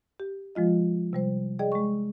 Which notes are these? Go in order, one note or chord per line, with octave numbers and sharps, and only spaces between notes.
G4
F3 G#3 F4 D#5
C3 G3 C5
G#4 D5 D#5 G5
G#3 C#6